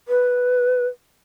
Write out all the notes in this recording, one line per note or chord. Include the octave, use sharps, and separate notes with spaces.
B4